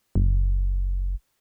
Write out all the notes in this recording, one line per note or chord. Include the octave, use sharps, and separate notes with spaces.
F#1